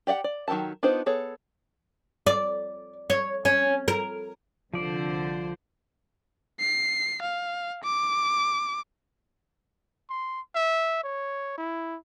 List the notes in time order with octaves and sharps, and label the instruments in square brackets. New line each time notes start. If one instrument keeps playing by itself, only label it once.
[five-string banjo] G4 D5 E5 F#5 G5
D5
D#3 F#3 G4 A4 A5
B3 D4 D#4 F4 C5
B3 G#4 A4 C#5
[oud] D5
C#5
C#4
A#4
[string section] C2 D3 C5 [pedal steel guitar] F3 D5
[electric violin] C7
F5
D6
[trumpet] C6
E5
C#5
E4